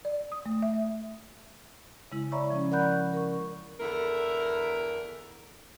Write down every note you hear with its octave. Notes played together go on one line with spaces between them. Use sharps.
D5
D#6
A3
E5
C#3 G#3 E4
C#5 D5 E5 A#5 B5 C#6
F3 C#4
A#4 D5 F#5 B5 F#6 G6
A#4 C#6
E2 D3 E4 A#4